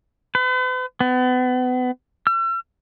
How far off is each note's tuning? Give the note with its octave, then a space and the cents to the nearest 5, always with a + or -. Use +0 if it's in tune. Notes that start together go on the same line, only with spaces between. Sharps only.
B4 +45
B3 +35
E6 +45